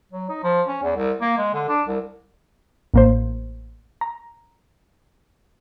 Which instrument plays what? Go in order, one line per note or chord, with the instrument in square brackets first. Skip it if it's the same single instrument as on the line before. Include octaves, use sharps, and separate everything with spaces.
[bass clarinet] F#3
D#4
F3
C#4
E2
C2
A#3
G#3
D3
D4
C2
[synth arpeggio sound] A1 A#3 C5
A#5